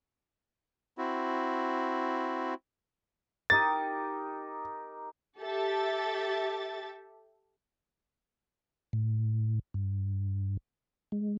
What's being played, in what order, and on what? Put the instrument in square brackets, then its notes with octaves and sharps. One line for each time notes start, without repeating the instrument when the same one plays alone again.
[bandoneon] C4 E4 F#4
[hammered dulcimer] D#4 G4 A#4 [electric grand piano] A6
[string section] G4 A4 E5 A6
[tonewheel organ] A2
G2
G#3